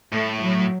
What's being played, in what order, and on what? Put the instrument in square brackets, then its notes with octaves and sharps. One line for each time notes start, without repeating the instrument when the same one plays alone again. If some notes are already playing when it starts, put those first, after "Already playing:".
[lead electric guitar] A2 [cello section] A3
[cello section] F#3